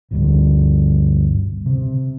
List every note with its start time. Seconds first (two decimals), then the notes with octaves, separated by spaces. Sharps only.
0.11 G1 D2 G2
1.66 C3